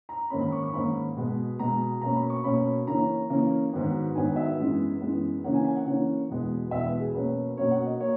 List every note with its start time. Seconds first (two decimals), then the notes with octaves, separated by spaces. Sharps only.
0.09 A#5
0.30 G#2 D#3 A#3 C#4 B5
0.41 B5
0.52 C#6
0.63 C#6
0.73 G#2 D#3 A#3 C#4 B5
1.16 B2 G#3 B3
1.59 B2 G#3 B3 A#5
2.01 B2 A#3 C#4 A#5
2.16 B5
2.30 C#6
2.44 B2 A#3 C#4 B5
2.87 C#3 E3 A#3 C#4 A#5
3.30 C#3 E3 A#3 C#4
3.73 G#2 D#3 F#3 B3
4.15 G#2 D#3 F#3 B3 G#5
4.36 E5
4.59 F#2 E3 G#3 B3
5.01 F#2 E3 G#3 B3
5.44 C#3 E3 A#3 C#4 F#5
5.54 G#5
5.65 G#5
5.76 F#5
5.86 C#3 E3 A#3 C#4
6.30 E2 B2 G#3 B3
6.71 E2 B2 G#3 B3 E5
6.86 B4
7.00 G#4
7.15 B2 F#3 A#3 C#4 B4
7.57 B2 F#3 A#3 C#4 C#5
7.71 F#5
7.86 D#5
8.00 F#3 A#3 C#5